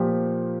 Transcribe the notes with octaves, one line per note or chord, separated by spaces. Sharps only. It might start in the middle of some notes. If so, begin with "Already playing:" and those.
Already playing: A#2 F3 G4